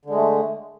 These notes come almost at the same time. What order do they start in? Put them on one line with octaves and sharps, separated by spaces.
D3 G#3 A3